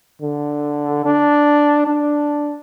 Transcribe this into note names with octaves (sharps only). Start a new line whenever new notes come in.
D3
D4
D4